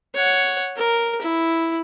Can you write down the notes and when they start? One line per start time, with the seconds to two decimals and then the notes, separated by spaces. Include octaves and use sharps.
0.15 C#5 F#5
0.77 A#4
1.22 E4